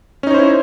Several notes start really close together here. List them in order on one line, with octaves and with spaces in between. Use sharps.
C#4 D#4 C#5 C5 E4